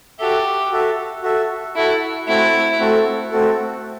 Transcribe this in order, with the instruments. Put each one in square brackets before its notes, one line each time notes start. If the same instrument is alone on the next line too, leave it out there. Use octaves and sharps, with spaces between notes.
[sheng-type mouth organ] F#4 A4 E5 [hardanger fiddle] G4
[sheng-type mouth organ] F#4 A4 E5
F#4 A4 E5
[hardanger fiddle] E4 [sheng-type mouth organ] F#4 A4 E5
[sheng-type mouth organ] A3 C4 F#4 A4 [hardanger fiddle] E4
[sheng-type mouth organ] A3 C4 F#4 A4
A3 C4 F#4 A4